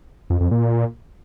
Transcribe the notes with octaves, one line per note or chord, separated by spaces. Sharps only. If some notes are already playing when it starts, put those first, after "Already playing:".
F2
F2
A#2